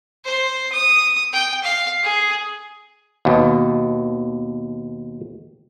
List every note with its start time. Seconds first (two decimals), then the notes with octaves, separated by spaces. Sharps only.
0.24 C5
0.72 D#6
1.33 G5
1.64 F5
2.03 G#4
3.25 D#2 B2